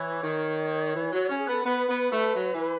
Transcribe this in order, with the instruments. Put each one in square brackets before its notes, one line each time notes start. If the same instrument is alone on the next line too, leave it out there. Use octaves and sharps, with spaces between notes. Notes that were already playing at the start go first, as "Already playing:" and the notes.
Already playing: [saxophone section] E3 [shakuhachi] C#5
[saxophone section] D#3
E3
F#3
C#4
[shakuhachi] G#4
[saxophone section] B3 [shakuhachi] A4
[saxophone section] B3 [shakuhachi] B4
[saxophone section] B3
A3
F#3
E3